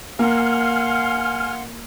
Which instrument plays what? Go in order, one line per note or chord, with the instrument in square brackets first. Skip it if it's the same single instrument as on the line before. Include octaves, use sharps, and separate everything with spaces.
[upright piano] A#3 [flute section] F5 F#5 C6 [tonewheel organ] G#5 F6